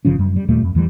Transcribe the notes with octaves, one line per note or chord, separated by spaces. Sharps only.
G1 C#3 F3 C#4
F#2 G3
G3
D#2 A#2 G3 A3
F2
E2 E3 F3 G3